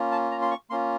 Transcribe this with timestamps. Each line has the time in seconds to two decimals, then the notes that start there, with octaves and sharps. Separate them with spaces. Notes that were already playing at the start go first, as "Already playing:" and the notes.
Already playing: A#3 C#4 F4
0.12 A5
0.31 A#5
0.42 C6
0.51 C#6
0.70 A#3 C#4 F4 C6